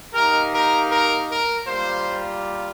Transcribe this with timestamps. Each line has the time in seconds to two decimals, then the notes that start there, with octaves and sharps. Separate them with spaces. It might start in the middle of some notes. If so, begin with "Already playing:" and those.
0.14 A#3 D#4 G4 A#4
0.52 A#4
0.90 A#4
1.29 A#4
1.67 G3 A#3 F4 C5